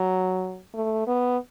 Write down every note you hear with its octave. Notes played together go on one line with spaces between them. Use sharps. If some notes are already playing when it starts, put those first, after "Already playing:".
Already playing: F#3
A3
B3